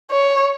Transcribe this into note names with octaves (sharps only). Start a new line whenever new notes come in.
C#5